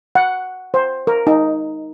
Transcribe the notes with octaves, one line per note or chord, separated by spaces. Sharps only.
F#5
C5
A#4
D#4